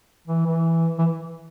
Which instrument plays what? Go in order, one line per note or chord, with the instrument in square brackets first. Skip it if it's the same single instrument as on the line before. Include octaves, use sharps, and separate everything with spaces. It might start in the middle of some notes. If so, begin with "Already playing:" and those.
[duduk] E3
E3
E3